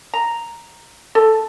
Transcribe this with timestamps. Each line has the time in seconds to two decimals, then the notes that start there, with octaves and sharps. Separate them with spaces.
0.14 A#5
1.15 A4